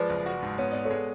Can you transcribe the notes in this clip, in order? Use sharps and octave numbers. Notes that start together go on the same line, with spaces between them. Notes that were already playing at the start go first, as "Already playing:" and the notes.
Already playing: F3 G#3 B4 D5
F#1
F#4
G#2
B3 C#5
B3 D5
A4 C#5
G#3